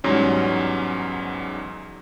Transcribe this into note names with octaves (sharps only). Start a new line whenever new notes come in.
E2 G#2 F#3 G3 C#4